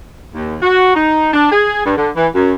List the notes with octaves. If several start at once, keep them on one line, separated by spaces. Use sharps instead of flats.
D#2
F#4
D#4
D4
G#4
G2
D3
E3
F#2